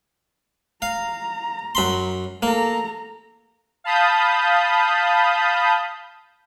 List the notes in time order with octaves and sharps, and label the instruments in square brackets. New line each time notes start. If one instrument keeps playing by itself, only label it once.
[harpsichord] F5 [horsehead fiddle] A#5
[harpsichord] F#2 B5 C6
[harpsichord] A#3 [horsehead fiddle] A4 A#5
[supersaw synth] F5 A5 B5 D#6 G6